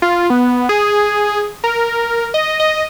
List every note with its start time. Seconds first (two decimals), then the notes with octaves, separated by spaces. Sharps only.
0.02 F4
0.30 B3
0.69 G#4
1.64 A#4
2.34 D#5
2.60 D#5